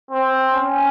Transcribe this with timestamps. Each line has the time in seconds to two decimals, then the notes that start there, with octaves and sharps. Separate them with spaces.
0.11 C4
0.53 C#4